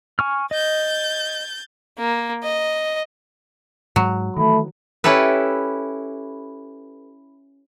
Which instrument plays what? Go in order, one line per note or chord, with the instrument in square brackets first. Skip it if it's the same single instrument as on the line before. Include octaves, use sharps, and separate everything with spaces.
[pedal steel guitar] G#5 C#6 F6
[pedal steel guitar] D#5 [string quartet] G6 A6
[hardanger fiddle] A#3
D#5
[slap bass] G#2 [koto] F#3
[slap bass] D#3 E3 [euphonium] A3 [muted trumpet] B5
[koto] C#4 E4 G4 A4 B4